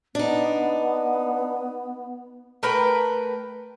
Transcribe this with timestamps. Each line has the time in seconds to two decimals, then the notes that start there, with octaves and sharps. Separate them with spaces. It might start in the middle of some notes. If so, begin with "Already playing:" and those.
0.15 B3 D4 D#4
2.63 A3 A#4 B4 G5